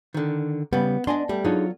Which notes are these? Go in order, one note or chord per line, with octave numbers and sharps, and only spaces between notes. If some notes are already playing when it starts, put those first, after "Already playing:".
D3 D#3
C#3 G3 B3
D4 D#5 G#5 C6
G3 A3
F#3 D4 D#4 F4 G#4 C#5